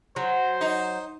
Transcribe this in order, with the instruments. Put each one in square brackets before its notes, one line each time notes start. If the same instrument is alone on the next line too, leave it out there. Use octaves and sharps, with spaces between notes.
[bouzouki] F#3 [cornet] C5
[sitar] D#4